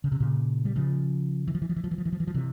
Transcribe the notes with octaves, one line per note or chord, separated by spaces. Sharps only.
C#3
C3
A#2 C#3
G3
C#3 F3
E3
F3
E3
F3
E3
F3
E3
F3
E3
F3
E3
F3
C3 E3